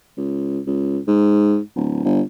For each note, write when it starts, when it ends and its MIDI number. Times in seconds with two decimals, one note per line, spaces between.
0.17 0.60 37
0.66 0.99 37
1.07 1.59 44
1.76 2.01 26
2.04 2.21 31